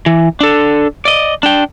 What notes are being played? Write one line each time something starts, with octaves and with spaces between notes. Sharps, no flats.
E3
D4 A4
D5 D#5
D4 G5